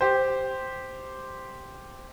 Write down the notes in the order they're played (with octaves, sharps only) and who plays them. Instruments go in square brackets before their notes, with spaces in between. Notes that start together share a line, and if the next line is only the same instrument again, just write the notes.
[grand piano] G4 C5